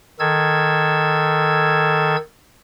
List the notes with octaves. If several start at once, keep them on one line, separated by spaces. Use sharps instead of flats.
D#3 A4 E6 G#6